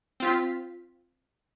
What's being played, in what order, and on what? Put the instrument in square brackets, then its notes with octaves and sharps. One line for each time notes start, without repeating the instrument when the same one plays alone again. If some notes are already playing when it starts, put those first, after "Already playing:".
[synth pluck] C4 F4 B6